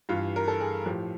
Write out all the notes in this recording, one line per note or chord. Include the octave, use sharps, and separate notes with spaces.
G2 E3 F4
A#4
A4
G#4
A2 F3 G4